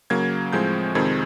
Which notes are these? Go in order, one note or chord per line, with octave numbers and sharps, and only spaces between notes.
C#3 F#3 A#3 G#6
A2 F3 G#3 C4 G6
F2 C3 D#3 G#3 C4 G#6